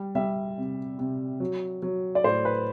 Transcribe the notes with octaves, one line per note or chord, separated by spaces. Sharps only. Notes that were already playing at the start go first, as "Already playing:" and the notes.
Already playing: G3
G3 E5
C3
C3
F#3
F#3
D5
A2 C5
B4